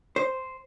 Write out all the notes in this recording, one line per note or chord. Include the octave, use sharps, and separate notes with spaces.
C5